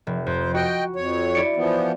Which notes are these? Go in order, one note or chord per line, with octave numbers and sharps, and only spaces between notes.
F1
F2 C5
F#4 D#5 G5
F2 C#5
E4 D5 C#7
E3 F3 B3